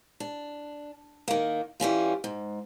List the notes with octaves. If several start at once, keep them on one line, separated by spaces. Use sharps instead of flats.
D4
D#3 A#3
E3 G3 C#4 F4
G#2